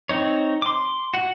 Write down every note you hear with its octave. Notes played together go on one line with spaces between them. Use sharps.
C4 D#4 C#5
C6 D6
F#4 F#5